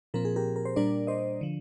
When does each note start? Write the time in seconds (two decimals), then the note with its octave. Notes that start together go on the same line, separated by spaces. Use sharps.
0.14 A#2 F3 C4 A#4
0.25 G#4
0.36 G4 A#4
0.56 A#4
0.65 C5
0.76 A#2 G3 D4 A#4 D5
1.07 C5 D#5
1.41 D3 F3